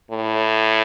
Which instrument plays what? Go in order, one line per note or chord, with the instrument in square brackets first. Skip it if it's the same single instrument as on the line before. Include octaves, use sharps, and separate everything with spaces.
[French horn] A2